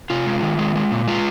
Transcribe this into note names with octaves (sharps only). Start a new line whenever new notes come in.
C3 F4
G#3
D#3
G#3
G#3
A#2
G#3 F4